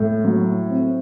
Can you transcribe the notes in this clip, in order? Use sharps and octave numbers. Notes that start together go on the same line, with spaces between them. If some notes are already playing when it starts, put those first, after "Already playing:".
Already playing: A2
F#3
C4